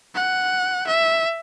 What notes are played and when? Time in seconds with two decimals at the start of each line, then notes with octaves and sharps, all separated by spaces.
0.15 F#5
0.87 E5